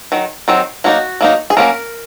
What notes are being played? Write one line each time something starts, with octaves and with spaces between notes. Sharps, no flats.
D#3 F#3
D#3 F#3 C4
F#3 A#3 D#4 F#4
F#3 A#3 D#4
G#4
F#3 A#3 C#4 A#4